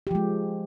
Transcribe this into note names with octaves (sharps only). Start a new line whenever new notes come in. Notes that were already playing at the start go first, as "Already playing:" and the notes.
F3 G#3 G4